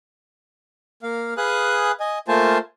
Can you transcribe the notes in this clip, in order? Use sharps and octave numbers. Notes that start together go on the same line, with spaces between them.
A#3 F5
G#4 B4 F5 G#5 D#6 F#6
D#5 G#5
A3 A#3 F4 C5 G#5 A5